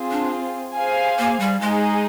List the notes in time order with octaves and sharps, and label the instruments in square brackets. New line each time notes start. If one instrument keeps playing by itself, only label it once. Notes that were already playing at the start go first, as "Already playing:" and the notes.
Already playing: [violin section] C4 F4 G#4
[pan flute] D4
[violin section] G#4 C5 F5 G#5
[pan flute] A#3
G3
[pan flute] G#3 [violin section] D#4 G#4 D#5